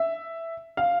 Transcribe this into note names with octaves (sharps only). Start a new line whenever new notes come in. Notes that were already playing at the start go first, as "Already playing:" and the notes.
Already playing: E5
F5